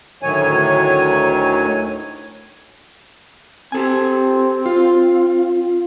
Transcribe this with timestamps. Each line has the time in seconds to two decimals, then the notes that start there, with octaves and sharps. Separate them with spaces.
0.23 D2 A2 D#3 F#3 C#5 G#5
3.72 C4 G4 A4 G#5
4.66 F4